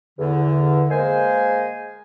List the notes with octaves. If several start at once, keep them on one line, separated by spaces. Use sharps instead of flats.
E2 D3
G#3 A#3 C5 G#5